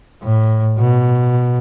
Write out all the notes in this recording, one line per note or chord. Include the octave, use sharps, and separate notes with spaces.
A2
B2